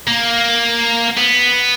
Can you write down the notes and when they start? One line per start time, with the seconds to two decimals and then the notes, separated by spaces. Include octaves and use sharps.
0.07 A#3
1.17 B3